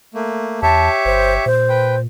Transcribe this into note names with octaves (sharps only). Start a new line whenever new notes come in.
A3 A#3
E2 G4 C#5 E5 A5
G1 C5
A#2 C5
B4 G5